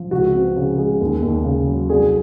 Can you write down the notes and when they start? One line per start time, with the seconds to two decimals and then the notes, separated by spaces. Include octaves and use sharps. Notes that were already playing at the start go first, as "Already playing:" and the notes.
Already playing: F3
0.11 C#2 F#4
0.34 C4
0.56 C#3
0.78 G#3
1.01 D#2
1.22 D#2
1.44 C#3
1.67 F#3
1.89 C2 G#4